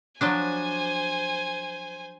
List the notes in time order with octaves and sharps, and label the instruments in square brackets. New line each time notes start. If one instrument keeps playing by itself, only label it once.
[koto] F3 F#3 D4 [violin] C5 G#5